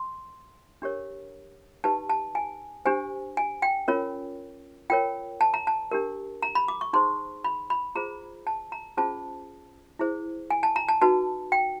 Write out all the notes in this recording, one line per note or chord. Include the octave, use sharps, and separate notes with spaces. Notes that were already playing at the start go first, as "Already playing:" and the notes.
Already playing: C6
D4 G4 A#4 C#5
D#4 G4 B4 A5
A5
G#5
D4 G4 C5 G#5
G#5
G5
C#4 F4 A#4 C#5
F4 A#4 C#5 G5
A5
A#5
A5
D4 G4 A#4
A#5
B5
D6
C#6
D#4 G#4 C5 C6
B5
B5
F4 G#4 C5 A#5
A5
A#5
C#4 F4 G#4 C5 A5
E4 G#4 C5
G#5
A5
A#5
A5
D#4 F#4 B4 A5
G5